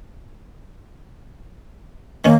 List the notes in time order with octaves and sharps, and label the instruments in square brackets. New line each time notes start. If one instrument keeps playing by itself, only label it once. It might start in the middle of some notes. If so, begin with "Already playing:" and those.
[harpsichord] D#3 C#4 [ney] A#3